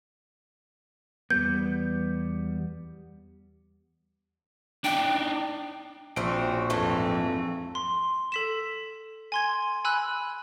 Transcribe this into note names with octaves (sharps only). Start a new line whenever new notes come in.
E2 G3 B3 G6
D4 D#4 G5
A#1 C4 C#4 F#4 D7
F2 G#2 E3 A3 C4
C6
A4 B6 E7
G#5 C6 G#6
G#5 B5 E6 F#6